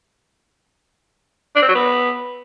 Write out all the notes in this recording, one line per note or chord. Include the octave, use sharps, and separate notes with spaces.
D4
C4
F#3
B3